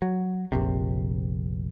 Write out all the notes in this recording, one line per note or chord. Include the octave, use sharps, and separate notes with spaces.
F#3
F1 A#1 C3